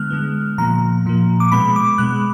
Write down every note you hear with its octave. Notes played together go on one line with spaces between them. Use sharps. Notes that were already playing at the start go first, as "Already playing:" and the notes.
Already playing: D3 G#3 B3 F6 F#6
D3 G#3 B3
A#2 F3 A#3 A#5
A#2 F3 A#3
D6
B2 G#3 B3 B5
D6
B2 G#3 B3 F#6